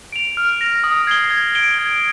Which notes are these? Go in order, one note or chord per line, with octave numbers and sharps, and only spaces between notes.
D7 F7
F6
A#6 F7
D#6
G#6 C7 G7
G#6
D7 G7
G#6